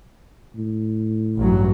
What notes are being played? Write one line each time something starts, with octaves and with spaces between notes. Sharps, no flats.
A2
A1 G2 F#3